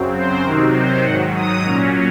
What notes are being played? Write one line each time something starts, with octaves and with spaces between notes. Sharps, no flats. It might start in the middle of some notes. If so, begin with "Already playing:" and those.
Already playing: F#2 C#3 F#3 C4
C5
C3 D#3 F#3 C4 D#4 A#4
C5
G#2 D#3 F#3 F#5
D#6
A#2 F#3 C#4 A#5